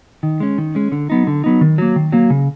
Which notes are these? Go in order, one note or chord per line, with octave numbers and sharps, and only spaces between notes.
D#3
G#3 C#4
D#3
G#3 C#4
D3
F#3 B3 D#4
D3
F#3 B3 D#4
D#3
F#3 A#3
D#3
F#3 A#3
C#3